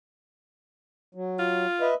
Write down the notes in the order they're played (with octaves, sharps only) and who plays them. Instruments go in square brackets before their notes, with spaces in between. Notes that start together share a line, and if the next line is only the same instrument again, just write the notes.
[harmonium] F#3
[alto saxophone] F4
[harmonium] B4 D#5 E5